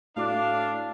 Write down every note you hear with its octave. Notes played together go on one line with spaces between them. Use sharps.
A2 D4 F#4 F5 D6